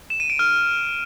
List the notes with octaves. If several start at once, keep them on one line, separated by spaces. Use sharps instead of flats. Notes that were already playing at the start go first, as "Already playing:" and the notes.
E7
D#7
D7
F6